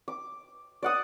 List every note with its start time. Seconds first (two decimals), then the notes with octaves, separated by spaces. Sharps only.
0.08 D6
0.83 D5 F#5 D#6